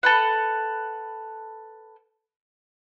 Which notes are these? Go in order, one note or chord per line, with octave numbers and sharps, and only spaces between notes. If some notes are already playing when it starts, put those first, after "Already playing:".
A4 B4 F#5